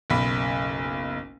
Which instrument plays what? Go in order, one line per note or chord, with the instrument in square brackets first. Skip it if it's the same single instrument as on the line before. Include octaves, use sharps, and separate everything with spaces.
[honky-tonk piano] F#1 B1 B5 B6